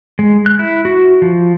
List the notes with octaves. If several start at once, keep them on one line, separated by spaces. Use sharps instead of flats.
G#3
F#6
E4
F#4
F3